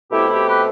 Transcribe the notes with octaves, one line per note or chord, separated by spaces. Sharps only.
B2 A3 C4 E4 G4
E4 G4
G4 B4